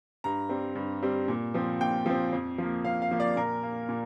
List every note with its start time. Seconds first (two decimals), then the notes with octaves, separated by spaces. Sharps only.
0.24 G2 A#5
0.49 G3 C4
0.75 G2
1.03 G3 C4
1.28 A#2
1.54 F3 C4
1.81 A#2 G5
2.06 F3 C4
2.32 F2
2.58 F3 A#3
2.85 F2 F5
3.02 F5
3.11 F3 A#3
3.20 D5
3.36 A#2 A#4
3.63 A#3
3.89 A#2